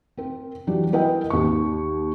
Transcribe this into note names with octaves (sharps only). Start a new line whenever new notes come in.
C4 A#4
E3 F#3 G3 D4
B3 E4 A#4 B4 D#5 G5
D#2 C#6